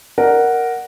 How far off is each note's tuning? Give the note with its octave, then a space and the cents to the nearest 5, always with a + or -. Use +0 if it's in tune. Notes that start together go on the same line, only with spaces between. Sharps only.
A#4 +0 D5 +0 F#5 +0